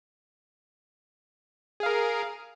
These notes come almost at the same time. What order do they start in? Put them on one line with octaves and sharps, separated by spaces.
G#4 F5 A#4